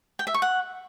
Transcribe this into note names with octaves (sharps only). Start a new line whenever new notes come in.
G5
E5
C#6
F#5